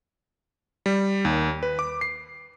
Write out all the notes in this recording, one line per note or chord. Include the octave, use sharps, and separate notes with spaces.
G3
D#2
B4
D6
C7